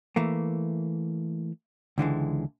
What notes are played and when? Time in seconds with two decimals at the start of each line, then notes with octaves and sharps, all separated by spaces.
0.16 E3 A3 A#3
1.98 C#2 D3 E3 G#3